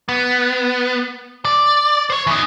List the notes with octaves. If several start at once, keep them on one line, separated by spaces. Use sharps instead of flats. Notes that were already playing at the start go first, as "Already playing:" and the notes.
B3
D5
C5 C#5
E3 D#4